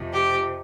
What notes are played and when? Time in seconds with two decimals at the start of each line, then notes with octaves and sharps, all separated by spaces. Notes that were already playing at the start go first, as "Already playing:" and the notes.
Already playing: F2 C3 F3
0.12 G4